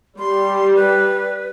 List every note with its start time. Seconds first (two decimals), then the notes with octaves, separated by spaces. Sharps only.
0.19 G3 C6
0.76 B4